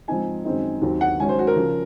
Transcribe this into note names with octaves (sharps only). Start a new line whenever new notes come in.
G#2 F3 C4 D#4 G#5
F#2 D#3 G#3 C4 D#4
D#2 D#3 F#3 C4
F#5
G#2 D#3 F#3 C#4 G#5
C5
F#4
A#4
C#3 F3